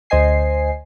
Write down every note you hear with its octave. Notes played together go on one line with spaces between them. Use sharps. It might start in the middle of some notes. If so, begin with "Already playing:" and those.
D2 C5 D#5 G#5 C7